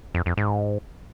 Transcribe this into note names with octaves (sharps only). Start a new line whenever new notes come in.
F2
F2
G#2